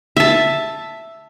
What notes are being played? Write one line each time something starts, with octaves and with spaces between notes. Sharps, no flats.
E5 A5